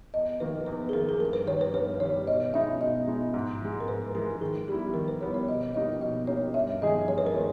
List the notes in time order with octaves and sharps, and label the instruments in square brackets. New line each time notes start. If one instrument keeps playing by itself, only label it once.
[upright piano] E2 [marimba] D#5
[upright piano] D#3 A#3 [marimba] B4
[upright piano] E2 [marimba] B4
[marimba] G#4
[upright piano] D#3 A#3 [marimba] A#4
[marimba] G#4
[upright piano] G2 [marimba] A#4
[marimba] B4
[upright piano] D#3 G3 [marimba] C#5
[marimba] B4
[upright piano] G2 [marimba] B4
[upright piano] D#3 G3 [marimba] C#5
[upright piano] B2 [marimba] D#5
[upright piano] G#3 B3 D#4 [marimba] E5
[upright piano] B2 [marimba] D#5
[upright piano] G#3 B3 D#4
G#2
E3 G#3
[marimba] A#4
[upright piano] G#2 [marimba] B4
[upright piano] E3 G#3 [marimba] A#4
[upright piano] D#3 [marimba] G#4
[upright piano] G3 B3 E4 [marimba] G4
[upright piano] D#3 [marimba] A#4
[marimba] B4
[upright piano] G3 B3 E4 [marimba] C#5
[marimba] C#5
[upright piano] B2 [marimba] D#5
[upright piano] A#3 D#4 G4 [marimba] D#5
[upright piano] B2 [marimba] D#5
[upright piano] A#3 D#4 G4 [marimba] C#5
[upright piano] G2 [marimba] E5
[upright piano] D#3 G#3 D#4 G#4 [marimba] D#5
[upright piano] G2 [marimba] C#5
[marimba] B4
A#4
[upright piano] D#3 G#3